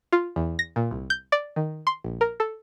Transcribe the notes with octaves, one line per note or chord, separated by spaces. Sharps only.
F4
E2
A#6
A#2
C2
G6
D5
D#3
C6
A#1
A#4
A4